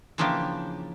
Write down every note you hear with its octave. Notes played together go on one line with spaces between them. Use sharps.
C#3 E3 F3 A#3 D4 G4